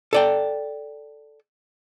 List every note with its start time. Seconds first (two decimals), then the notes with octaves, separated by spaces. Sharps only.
0.13 A4 D5 G5